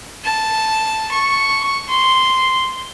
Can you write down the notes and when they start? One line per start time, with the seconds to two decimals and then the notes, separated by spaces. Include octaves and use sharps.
0.24 A5
1.11 C#6
1.89 C6